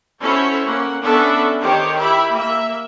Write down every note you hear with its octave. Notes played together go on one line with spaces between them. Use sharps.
C#4 E4 F#4 A4 C5 C#5
A#3 C#4 F#5
B3 C#4 D4 A4 E5 F#5
D#3 G4 C5 C#5
E4 G4 E5 B5
A#3 E5